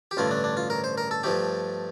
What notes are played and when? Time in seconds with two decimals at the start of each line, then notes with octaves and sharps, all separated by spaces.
0.11 G4
0.17 A1 G2 D3 A3 F4
0.31 D4
0.44 D4
0.57 F4
0.70 A#4
0.84 C5
0.98 A#4
1.11 A4
1.23 G2 F3 A3 G4